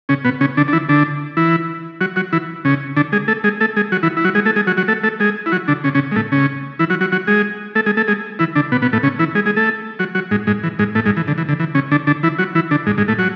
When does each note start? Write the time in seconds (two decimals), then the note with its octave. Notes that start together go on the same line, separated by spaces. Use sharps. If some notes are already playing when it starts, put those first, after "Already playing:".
0.09 C#3 C#4
0.24 B2 B3
0.41 C#3 C#4
0.57 D3 D4
0.68 D4
0.73 E3 E4
0.89 D3 D4
1.37 E3 E4
2.01 F#3 F#4
2.16 F#3 F#4
2.33 E3 E4
2.65 C#3 C#4
2.97 D3 D4
3.12 G#3 G#4
3.28 A3 A4
3.44 G#3 G#4
3.61 A3 A4
3.76 G#3 G#4
3.92 F#3 F#4
4.03 E3 E4
4.17 E4
4.25 F#3 F#4
4.35 G#3 G#4
4.45 A3 A4
4.56 G#3 G#4
4.67 F#3 F#4
4.77 F#3 F#4
4.88 A3 A4
5.04 A3 A4
5.20 G#3 G#4
5.46 E4
5.52 F#3 F#4
5.68 D3 D4
5.84 C#3 C#4
5.95 C#3 C#4
6.11 G#3
6.16 A2 A3
6.32 C#3 C#4
6.79 E3 E4
6.90 F#3 F#4
7.01 F#3 F#4
7.12 F#3 F#4
7.27 G#3 G#4
7.75 A3 A4
7.86 G#3 G#4
7.97 A3 A4
8.08 G#3 G#4
8.39 E3 E4
8.55 D3 D4
8.72 B2 B3
8.82 B2 B3
8.93 A2 A3
9.03 C#3 C#4
9.19 E3 E4
9.35 G#3 G#4
9.46 G#3 G#4
9.56 A3 A4
9.99 F#3 F#4
10.15 F#3 F#4
10.31 G#2 G#3
10.47 G#2 G#3
10.63 E3
10.79 G#2 G#3
10.95 A2 A3
11.05 G#2 G#3
11.17 E3
11.28 D3
11.38 E3
11.49 D3
11.60 E3
11.75 C#3 C#4
11.91 D3 D4
12.07 D3 D4
12.23 E3 E4
12.38 F#3 F#4
12.55 E3 E4
12.71 D3 D4
12.86 G#2 G#3
12.98 G#2 G#3
13.08 A2 A3
13.18 F#3 F#4